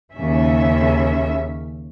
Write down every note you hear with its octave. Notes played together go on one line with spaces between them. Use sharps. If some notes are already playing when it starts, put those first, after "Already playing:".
D#2 C#3 C#4 E5